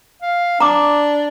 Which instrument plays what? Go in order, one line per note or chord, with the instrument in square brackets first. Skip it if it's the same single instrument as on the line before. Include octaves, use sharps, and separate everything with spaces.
[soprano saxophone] F5
[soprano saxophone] D4 [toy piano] A#5 D6